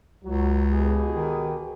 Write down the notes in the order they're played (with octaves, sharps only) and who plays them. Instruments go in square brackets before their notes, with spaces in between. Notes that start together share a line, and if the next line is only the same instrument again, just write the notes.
[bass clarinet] C#2 [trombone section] F#3
[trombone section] B2 G4 G#4
[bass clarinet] D#3